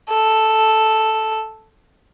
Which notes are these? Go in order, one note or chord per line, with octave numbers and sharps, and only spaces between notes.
A4